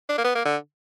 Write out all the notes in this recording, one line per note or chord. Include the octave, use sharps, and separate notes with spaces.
D4
A#3
B3
A#3
D3